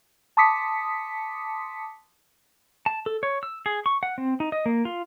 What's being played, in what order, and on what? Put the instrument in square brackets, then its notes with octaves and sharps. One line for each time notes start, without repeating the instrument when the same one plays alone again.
[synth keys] A5 C6 D6 D#6 B6 C#7
[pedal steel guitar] A5
A4
C#5
E6
G#4
C#6
F#5
C4
D#4
D#5
A#3
F4